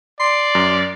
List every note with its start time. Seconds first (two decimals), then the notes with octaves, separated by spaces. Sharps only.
0.20 D5 C6
0.55 F#2